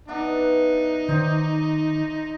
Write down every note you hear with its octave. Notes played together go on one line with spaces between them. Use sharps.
E3 B3 D4 D#4
D#3 C5 D5 D#5